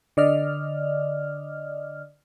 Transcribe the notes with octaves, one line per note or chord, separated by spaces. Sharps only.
D3 D5 D#5 F6